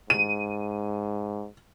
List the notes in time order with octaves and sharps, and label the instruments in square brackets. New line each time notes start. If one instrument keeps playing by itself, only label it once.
[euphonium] G#2 [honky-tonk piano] D#7